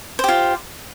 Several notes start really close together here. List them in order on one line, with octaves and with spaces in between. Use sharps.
C5 G4 F4